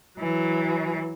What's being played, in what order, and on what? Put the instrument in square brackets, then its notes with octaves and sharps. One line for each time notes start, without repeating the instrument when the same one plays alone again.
[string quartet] E3 F#3